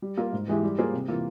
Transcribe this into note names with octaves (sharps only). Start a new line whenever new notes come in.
G3
A#3 F4 A#4
G#2
E3 G#3 E4 G4
G3
A#3 F4 G#4 C5
C3
E3 A#3 F4